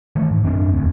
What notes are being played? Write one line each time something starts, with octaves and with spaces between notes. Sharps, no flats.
D#3 E3 A3
G#2
F#2 C4 D4
E1 D2